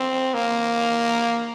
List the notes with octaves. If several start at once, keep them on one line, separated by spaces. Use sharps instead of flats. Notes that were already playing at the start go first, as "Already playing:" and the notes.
Already playing: C4
A#3